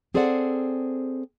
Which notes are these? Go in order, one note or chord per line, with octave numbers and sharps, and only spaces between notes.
C4 G#4 A4 C5 D5 F#5